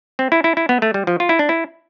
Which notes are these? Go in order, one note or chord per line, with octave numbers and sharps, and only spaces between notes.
C4
E4
E4
E4
B3
A3
G3
F3
F4
E4
D4
E4